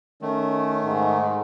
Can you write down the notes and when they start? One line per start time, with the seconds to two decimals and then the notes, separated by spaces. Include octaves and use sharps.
0.22 D#3 A3 C#4
0.85 G#2